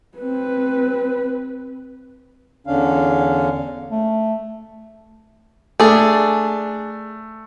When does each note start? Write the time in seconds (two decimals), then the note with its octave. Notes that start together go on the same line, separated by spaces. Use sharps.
0.18 C4 B4
2.67 E2 D3 C#4 D4 F5
3.91 A3
5.80 A3 D4 G#4